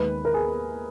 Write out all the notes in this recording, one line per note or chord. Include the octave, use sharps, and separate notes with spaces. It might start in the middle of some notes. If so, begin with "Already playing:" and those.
Already playing: D#2 D#3 G#3 B4
A#4
G#4